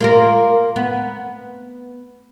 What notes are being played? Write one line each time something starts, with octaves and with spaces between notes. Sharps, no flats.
A#3 F4 A#4
B3